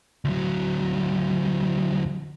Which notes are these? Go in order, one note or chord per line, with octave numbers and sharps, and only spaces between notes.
D2 F#3